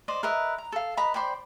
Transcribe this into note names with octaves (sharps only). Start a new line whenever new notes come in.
C5 D5 D#5
A#4 B4 D#5 E5
A#5
A4 F5
B4 D#5 A#5 B5
C5 D5 G5 B5